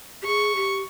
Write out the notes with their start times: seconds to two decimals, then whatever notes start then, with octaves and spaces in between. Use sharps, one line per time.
0.22 G4
0.26 G#4 C#6
0.56 G4